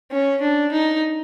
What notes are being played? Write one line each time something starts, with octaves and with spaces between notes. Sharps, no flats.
C#4
D4
D#4